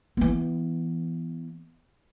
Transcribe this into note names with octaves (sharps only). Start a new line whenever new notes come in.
E3 B3